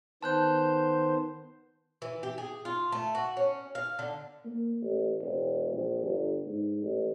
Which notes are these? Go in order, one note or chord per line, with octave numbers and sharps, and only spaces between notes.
D#3 B3 C5 A5 F#6 G6
E3
G4
G#4
F4
A3
F#4
C#4
F5
D3
A#3
A1
E1
A#1
G1
G#2
A1